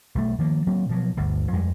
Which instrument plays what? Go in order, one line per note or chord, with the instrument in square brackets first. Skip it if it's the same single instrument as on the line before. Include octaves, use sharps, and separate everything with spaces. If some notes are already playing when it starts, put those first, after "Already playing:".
[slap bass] B1 G3 A3
D#3 F3 A#3
F#3 A#3 C4
B2 F3 F#3
G1 D2
F2 G3 G#3